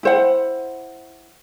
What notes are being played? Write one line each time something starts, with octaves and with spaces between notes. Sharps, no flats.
E4 C5 F#5